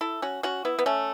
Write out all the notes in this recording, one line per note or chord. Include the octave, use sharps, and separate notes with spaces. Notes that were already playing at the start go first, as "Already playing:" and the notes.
E4 A4
C#4 F#4
C#4 F#4
B3 E4
B3
A3 C#4